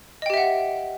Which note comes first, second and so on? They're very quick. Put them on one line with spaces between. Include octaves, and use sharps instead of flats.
D#5 G5 G4 E5 F#5